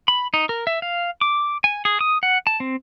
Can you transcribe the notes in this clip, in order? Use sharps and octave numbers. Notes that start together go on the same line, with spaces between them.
B5
D#4
A#4
E5
F5
D6
G#5
G#4
D#6
F#5
A5
C4